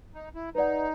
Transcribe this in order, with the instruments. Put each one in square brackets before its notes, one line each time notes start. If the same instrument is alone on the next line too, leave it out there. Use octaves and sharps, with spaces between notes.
[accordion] D#4
E4
[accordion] D#4 [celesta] B4 D5 F#5